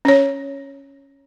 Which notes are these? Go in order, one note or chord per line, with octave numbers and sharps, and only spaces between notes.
C#4 C#5